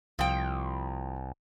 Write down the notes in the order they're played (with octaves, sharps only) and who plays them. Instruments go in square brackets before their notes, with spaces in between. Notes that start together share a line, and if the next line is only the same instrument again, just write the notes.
[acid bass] C2 [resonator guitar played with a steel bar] F3 G5